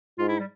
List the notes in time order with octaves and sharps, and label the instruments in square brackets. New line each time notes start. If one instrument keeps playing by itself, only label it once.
[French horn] G#2 [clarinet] F4
[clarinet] E4
G3